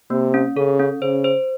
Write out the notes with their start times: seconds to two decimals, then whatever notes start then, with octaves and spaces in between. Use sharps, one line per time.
0.10 C3 A#3
0.34 C#4
0.56 C#3 A4
0.79 C#4
1.02 C#3 C5
1.24 C5